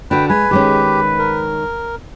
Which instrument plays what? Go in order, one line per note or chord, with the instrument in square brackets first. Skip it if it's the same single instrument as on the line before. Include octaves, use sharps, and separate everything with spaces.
[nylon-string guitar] D3 F#4 [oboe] B4 [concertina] G5
[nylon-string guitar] G#3 [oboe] B4 [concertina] G#5
[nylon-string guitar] D#3 G#3 C#4 [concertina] G4
[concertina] A#4